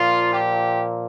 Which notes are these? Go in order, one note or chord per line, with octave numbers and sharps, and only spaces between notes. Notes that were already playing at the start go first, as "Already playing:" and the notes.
Already playing: A#2 F3 F4
G4